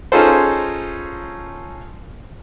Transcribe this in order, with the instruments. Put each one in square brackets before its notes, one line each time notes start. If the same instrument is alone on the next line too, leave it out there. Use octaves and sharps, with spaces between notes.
[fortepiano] C#4 D#4 F4 G#4 A4 C5